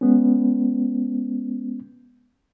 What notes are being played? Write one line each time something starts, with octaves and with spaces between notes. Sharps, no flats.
G#3 B3 C#4